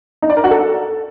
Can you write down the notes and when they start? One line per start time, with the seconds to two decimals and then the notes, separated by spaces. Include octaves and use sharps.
0.22 D#4
0.30 D5
0.37 A#4
0.44 F#4
0.51 A4